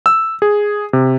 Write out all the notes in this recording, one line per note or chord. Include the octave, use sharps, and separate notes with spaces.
E6
G#4
C3